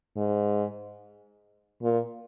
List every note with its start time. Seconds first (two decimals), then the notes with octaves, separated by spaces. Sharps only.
0.17 G#2
1.82 A#2